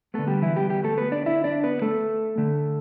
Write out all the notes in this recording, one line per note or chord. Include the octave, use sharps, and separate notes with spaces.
D3 A3 B3 A4
G3 G4
E3 E4
G3 G4
G3 G4
A3 A4
B3 B4
D4 D5
E4 E5
D4 D5
B3 B4
A3 A4
D3 A3